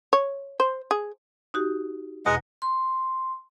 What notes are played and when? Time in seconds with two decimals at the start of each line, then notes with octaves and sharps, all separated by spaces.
0.13 C#5
0.60 C5
0.91 G#4
1.54 D#4 F#4 G4
2.26 E2 B2 G#3 D#5 F#5 A#5
2.62 C6